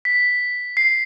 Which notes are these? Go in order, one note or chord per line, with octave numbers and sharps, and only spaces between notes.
B6
C7